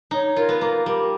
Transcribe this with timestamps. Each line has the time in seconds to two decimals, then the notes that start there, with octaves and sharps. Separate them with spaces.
0.11 D#4 C#5
0.36 F4 A#4
0.49 B3
0.61 A#3 A#4
0.86 G3 A#4